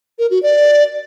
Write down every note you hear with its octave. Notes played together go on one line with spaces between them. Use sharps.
A#4
F#4
D5